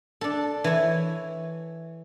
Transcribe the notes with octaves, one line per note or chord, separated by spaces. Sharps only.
D4 A4
E3 C#5